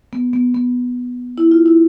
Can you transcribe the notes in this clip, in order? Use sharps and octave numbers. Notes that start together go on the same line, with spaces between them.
B3
B3
B3
E4
F4
E4